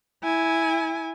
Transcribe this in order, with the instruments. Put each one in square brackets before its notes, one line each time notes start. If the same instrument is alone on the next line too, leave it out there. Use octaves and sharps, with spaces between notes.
[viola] E4 G#5